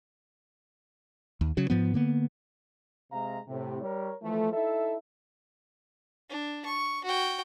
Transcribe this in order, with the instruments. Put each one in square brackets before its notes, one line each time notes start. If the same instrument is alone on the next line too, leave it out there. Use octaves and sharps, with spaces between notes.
[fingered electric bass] D#2
C#3 F#3
G#2 F3 B3
D3 A#3 B3
[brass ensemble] C3 G#3 F5 A#5
A2 C3
G3 A#4 C#5
E3 F3 A3
D#4 E4 A4 E5
[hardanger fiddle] D4
C#6
F#4 G5